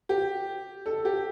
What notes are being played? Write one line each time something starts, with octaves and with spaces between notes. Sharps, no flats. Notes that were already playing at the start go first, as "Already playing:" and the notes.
G4
A4
G4